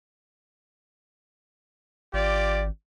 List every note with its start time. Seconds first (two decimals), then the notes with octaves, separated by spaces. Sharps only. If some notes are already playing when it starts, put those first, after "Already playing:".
2.14 G#1 F4 G4 D5